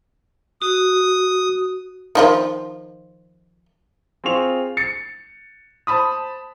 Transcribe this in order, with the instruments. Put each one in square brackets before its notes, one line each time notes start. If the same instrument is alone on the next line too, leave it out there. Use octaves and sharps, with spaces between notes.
[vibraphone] F#4 [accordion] D#6
[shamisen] D#3 F3 F4
[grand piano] C4 F4 G#4 C#6 F7
A6 C#7
C5 A5 B5 D#6